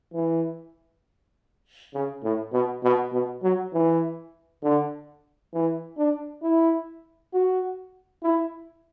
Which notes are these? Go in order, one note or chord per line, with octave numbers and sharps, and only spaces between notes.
E3
C#3
A2
B2
B2
B2
F#3
E3
D3
E3
D4
E4
F#4
E4